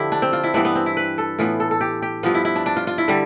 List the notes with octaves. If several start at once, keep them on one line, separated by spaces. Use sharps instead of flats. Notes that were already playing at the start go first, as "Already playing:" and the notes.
Already playing: D3 F3 E4 G4
D4
C4
F4
E4
G2 E3 B3 D4
B3
C4
E4
B4
A4
A2 E3 B3 F4
A4
A4
G4
G4
G2 F3 B3 F4
E4
E4
D4
D4
F4
F4
E4
D3 G3